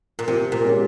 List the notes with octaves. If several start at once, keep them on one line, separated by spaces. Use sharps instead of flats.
A#2
C3 F3
A#2
G#3 C#4 G4